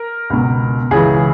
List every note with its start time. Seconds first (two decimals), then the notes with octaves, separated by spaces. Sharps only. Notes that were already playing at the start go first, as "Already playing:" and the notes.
Already playing: A#4
0.30 C#2 B2
0.91 C#2 C#3 E3 G#4